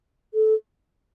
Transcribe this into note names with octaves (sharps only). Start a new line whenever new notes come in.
A4